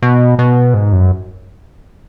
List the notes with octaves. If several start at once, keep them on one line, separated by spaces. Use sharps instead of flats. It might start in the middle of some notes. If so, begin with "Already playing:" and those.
B2
B2
G#2
F#2